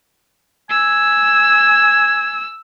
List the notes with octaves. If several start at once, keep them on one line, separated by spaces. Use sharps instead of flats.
G#5 E6